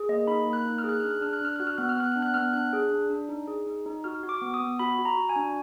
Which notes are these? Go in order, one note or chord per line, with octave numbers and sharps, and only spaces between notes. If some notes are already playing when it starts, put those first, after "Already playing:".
Already playing: G#4
A#3 D#5
D#4 B5
A#3
F#6
D#4
F6
G#4
F#6
D4 F6
F#6
D4 F6
F#6
D4 F6
F#4 F#6
F6
B3 F#6
F6
B3 F#6
D4 F6
F#6
B3 F6
D4 F#6
G#4
D4
D4
D#4
G#4
D#4
D#4
F#4 F6
F#4
D6
B3
D#6
B3
F#4 B5
F#4
A#5
F#4
G#5
D4